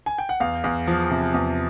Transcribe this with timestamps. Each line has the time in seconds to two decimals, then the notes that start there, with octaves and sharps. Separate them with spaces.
0.06 G#5
0.18 G5
0.29 F#5
0.40 E2 F5
0.64 E2
0.87 F3
1.11 C3
1.34 E2